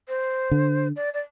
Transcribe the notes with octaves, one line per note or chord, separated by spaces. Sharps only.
C5
D3
D5
D5